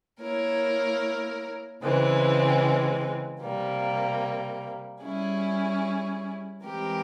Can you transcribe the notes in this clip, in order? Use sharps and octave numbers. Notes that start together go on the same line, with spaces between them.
A#3 E4 A#4 C#5
C#3 E3 G#3 C4
C3 G3 A#3
G3 C#4 E4 G#4
E3 G#3 C4 G4 A#4